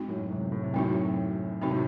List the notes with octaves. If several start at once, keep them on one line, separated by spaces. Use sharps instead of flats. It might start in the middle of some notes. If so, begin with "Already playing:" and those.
Already playing: G#2 C4 D#4 F#4
F#2 A2
G#2 C3
A2
C3
F#2 A2 C4 D#4 F#4
C3 C4 D#4 F#4
A2